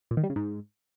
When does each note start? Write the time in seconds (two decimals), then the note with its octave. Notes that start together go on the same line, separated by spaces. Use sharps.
0.11 A#2
0.17 D#3
0.23 G3
0.30 C#3
0.36 G#2